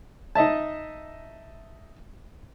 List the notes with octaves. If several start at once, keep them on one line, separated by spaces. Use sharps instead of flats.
D#4 D#5 E5 A5